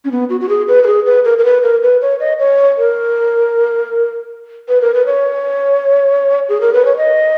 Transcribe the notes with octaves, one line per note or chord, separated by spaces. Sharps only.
C#4
B3
F#4
F#4
G#4
B4
A#4
G#4
B4
A#4
A#4
B4
A#4
B4
C#5
D#5
C#5
A#4
B4
A#4
B4
C#5
G#4
A#4
B4
C#5
D#5